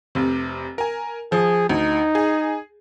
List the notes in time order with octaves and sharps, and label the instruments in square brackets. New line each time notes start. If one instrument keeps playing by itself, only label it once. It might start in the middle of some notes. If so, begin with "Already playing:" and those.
[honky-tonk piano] F1 C3
A#4 G#5
[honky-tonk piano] F3 [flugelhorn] G#4
[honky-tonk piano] D2 [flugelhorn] D#4
[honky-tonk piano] G#4